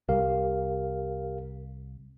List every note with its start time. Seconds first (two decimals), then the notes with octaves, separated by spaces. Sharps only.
0.09 C2 G4 A#4 F5